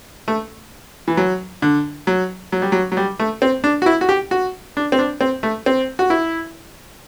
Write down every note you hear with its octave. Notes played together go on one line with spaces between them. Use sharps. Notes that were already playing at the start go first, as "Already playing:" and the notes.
A3
E3
F#3
D3
F#3
F#3
G3
F#3
F#3
G3
A3
C4
D4
F#4
E4
F#4
G4
F#4
D4
C4
D4
C4
A3
C4
F#4
E4